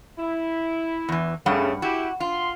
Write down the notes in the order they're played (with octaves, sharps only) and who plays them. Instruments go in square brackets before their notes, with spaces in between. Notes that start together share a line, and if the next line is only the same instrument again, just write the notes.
[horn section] E4
[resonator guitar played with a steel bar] E2 E3
[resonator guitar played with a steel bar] G2 G3 F#5 [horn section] C#3 A3
[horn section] E4 G4 [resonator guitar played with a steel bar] F#4
[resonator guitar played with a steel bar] F4 [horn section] C6